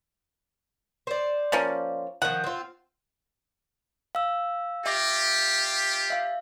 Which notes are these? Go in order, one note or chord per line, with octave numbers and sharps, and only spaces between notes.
C5 D5
F3 A#3 C#4
D#3 F3 F#5
C4 F4
F5 E6
F4 G4 E5 D6 A#6
E5 F5